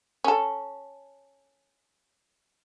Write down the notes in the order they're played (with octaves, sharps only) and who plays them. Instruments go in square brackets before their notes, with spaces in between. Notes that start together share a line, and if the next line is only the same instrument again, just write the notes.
[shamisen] C#4 A4